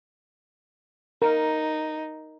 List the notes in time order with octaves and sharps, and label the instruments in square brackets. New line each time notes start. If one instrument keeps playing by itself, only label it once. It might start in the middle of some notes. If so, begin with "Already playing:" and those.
[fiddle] D#4 [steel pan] A#4